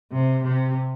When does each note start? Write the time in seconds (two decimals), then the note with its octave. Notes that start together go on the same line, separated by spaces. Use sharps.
0.12 C3
0.43 C3